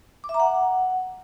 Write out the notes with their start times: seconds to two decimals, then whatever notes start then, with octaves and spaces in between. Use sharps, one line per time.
0.24 D6
0.29 E5
0.34 A#5
0.40 F#5